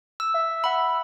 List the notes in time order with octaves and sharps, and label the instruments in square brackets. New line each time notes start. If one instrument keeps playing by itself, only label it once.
[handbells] E6
[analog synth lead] E5
[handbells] F#5 B5